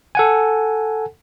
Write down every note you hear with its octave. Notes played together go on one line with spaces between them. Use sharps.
A4 F#5 G#5